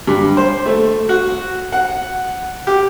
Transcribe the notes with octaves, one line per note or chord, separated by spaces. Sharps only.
G2
C5
A3
F#4
F#5
G4